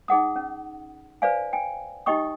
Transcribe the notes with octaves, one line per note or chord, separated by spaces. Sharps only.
D#4 G#4 F#5 D#6
C#4
B4 C5 D5 F5 G#5
G5 G#5
D#4 G4 D#5 G5 C#6 D#6